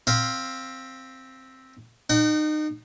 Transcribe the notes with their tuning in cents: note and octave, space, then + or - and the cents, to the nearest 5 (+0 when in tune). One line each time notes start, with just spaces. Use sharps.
C4 +5 F5 +0 B5 -35
D#4 -30 F#5 +45